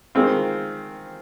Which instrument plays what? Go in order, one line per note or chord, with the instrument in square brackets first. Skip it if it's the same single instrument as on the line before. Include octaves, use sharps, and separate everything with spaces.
[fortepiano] D#3 G#3 C4 F4